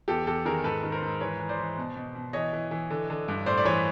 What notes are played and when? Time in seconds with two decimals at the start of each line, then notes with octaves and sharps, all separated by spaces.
0.08 E2 G4 A4
0.27 E2 G4 A4
0.45 D#3 G#4 A#4
0.64 G#2 A4 B4
0.83 D#3
0.92 A#4 C5
1.02 G#2
1.21 E3 B4 C#5
1.40 E3
1.49 C5 D5
1.59 E3
1.78 B2
1.96 B2
2.15 B2
2.33 E3 C#5 D#5
2.53 E3
2.71 E3
2.90 D3
3.10 D3
3.28 G2
3.46 A2 C5 D5
3.57 D5
3.65 E3 B4 C#5